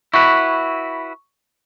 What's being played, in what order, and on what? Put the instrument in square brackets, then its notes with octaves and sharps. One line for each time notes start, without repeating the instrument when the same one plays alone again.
[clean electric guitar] E4 F#4 B4 [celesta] C#6